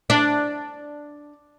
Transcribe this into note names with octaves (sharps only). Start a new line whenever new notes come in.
D4